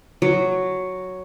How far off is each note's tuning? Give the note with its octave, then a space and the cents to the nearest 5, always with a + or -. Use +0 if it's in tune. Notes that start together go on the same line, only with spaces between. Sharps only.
F#3 +0